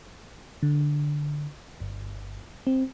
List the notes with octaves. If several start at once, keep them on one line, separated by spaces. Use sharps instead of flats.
D3
G1
C4